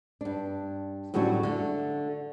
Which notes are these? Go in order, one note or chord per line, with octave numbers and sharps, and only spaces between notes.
G2 D4
A2 D3 F#3 G3 C#4 F#4
D3 A3